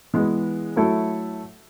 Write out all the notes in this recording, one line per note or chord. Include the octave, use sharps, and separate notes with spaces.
E3 G#3 B3
F#3 A3 E4 A4